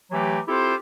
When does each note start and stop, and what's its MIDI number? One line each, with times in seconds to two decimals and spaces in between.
0.11 0.39 52
0.11 0.39 54
0.11 0.39 57
0.11 0.39 67
0.48 0.74 60
0.48 0.74 64
0.48 0.74 65
0.48 0.74 67
0.48 0.74 69
0.48 0.74 72